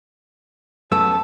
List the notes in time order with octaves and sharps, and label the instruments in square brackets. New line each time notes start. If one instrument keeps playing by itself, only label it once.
[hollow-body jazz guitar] F#2 A3 B3 [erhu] A5 [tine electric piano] E6